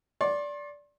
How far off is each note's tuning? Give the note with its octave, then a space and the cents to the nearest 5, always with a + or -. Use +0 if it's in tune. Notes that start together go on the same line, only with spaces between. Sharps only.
D5 -15 C6 +40